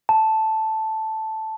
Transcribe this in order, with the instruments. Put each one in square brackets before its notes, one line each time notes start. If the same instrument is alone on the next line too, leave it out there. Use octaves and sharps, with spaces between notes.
[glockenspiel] A5